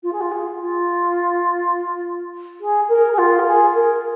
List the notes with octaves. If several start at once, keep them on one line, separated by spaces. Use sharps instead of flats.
F4
G#4
F4
G#4
F4
G#4
A#4
G#4
F4
A#4
G#4
A#4